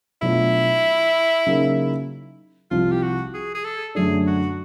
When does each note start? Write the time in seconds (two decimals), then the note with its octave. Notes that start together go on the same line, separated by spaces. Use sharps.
0.21 B2 F#3 A3 D4 E4 F4
1.47 C#3 F#3 A#3 D#4
2.71 C2 C3 F3 F4
2.91 G4
3.02 F#4
3.34 G#4
3.55 G#4
3.64 A4
3.95 F#2 D3 F#3 A3 D4 G#4
4.27 F#4